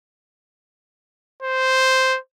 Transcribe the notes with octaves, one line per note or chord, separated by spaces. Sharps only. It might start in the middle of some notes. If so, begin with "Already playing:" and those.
C5